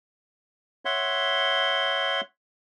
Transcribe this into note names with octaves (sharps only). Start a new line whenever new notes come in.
C#5 E5 F#5 C6